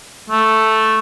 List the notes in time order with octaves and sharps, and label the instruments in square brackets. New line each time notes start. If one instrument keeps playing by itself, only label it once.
[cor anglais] A3